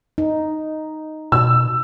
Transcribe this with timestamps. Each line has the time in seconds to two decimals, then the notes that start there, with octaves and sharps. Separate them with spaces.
0.18 D#4
1.32 B2 E6